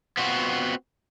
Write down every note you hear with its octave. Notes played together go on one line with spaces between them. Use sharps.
B3 C4 F4 F#4